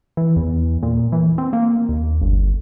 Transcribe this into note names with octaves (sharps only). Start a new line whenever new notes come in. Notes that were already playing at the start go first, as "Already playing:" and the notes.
E3
E2
A#2
E3
C4
A#3
D#2
G1